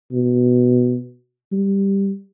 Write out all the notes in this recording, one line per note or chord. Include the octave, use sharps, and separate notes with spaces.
B2
G3